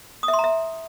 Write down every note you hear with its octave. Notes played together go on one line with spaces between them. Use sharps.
D#6
E5
C6
A#5
E5